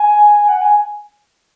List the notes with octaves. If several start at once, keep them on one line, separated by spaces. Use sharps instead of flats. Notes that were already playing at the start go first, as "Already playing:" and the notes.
Already playing: G#5
F#5
G#5